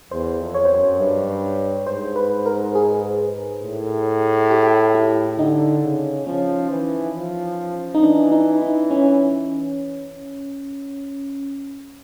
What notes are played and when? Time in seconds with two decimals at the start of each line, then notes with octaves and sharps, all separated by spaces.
0.11 E2 C5
0.40 F2
0.54 C#5
0.65 C5
0.70 F#2 C#5
0.99 G2
1.87 G#2 C5
2.16 B4
2.46 A#4
2.75 G#4
3.63 A2
4.51 G4
4.95 E4
5.38 D3 D#4
5.83 C#3
6.27 F3 C#4
6.70 E3
7.15 F3
7.94 D#4
8.02 E3 D4
8.32 D#4
8.61 D#4
8.91 C#4